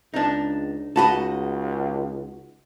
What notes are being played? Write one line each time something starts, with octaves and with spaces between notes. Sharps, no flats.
C#2 D4 D#4
C#2 D#4 F#4 D#5 A5 B5